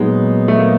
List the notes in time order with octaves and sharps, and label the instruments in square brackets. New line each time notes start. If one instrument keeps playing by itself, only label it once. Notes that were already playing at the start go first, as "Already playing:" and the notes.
Already playing: [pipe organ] A#2 F#3 B3 D#4 [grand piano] G#3
[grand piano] A3
A#3